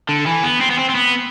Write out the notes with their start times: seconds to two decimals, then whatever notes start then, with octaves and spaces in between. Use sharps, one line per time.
0.09 D3
0.26 E3
0.44 B3
0.61 C4
0.71 B3
0.79 C4
0.89 C4
0.95 B3